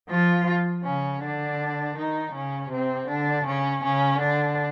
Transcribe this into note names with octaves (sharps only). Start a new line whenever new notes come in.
F3 F4
C#3 C#4
D3 D4
D#3 D#4
C#3 C#4
C3 C4
D3 D4
C#3 C#4
C#3 C#4
D3 D4